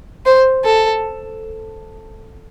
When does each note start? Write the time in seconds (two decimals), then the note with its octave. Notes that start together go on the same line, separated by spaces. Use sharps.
0.26 C5
0.65 A4